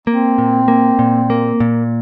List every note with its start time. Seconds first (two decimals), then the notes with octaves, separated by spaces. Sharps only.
0.07 A#3 C4
0.38 A#2
0.68 A#3
0.99 A#2
1.30 A#3
1.60 A#2